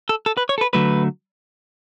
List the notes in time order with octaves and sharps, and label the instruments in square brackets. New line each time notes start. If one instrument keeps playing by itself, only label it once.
[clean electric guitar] A4
A4
B4
C#5
A4
B4
D3 F#3 A3 B4